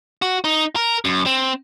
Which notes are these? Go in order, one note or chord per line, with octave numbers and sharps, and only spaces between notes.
F#4
D#4
A#4
F#2
C4